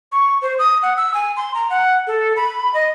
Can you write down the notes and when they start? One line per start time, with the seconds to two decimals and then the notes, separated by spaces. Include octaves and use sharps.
0.12 C#6
0.42 C5
0.59 D#6
0.83 F#5
0.97 E6
1.14 G#5
1.36 C6
1.54 A#5
1.70 F#5
2.07 A4
2.36 B5
2.74 D#5